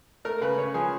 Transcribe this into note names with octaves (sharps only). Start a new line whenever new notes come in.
A3 A#4
C#3 B4
C#3 C#5
F3 G#4